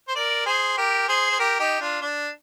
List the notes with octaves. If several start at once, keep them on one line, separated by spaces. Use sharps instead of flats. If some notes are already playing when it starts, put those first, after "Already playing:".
C5
A#4 D5
G#4 C5
G4 A#4
G#4 C5
C5
G4 A#4
D#4 G4
D4 F4
D4